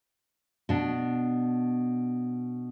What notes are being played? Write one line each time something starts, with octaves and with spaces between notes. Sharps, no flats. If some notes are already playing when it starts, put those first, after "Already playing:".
B2 D4